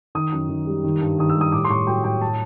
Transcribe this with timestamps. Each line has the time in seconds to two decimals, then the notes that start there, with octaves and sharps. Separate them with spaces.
0.15 D#3 D#6
0.32 F#2
0.49 D#3
0.67 G3
0.84 D#3
1.01 G2
1.19 D#3 D#6
1.29 E6
1.36 G3
1.41 D#6
1.52 A2 D6
1.65 C6
1.70 A2 C#6
1.87 F#3 G5
2.04 A2 G5
2.21 A5